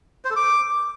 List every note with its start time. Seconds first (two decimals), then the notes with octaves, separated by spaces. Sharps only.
0.25 C5
0.30 A4
0.36 D6